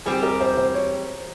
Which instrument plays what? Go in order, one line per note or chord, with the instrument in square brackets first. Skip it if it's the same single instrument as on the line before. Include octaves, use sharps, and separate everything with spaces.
[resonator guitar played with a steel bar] G3 C4 G4 [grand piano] G#4
[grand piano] A#4
C5
C5
C#5